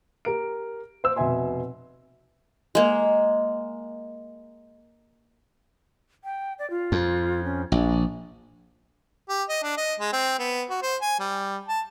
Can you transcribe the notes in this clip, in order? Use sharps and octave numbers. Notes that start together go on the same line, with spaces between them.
G4 A#4 D7
C5 E6
F1 B2 E5 G#5 C6
G#3 A#3
G5
D5
F4
F2
C#4
A#1 D4
G4
D#5
D4
D#5
G#3
C4
B3
F#4
C5
G#5
G3
A5